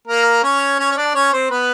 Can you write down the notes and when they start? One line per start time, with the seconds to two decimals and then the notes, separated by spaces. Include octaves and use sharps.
0.07 A#3 A#4
0.43 C#4 C#5
0.79 C#4 C#5
0.91 C#5
0.97 D4 D5
1.15 C#4 C#5
1.33 C4 C5
1.51 B3 B4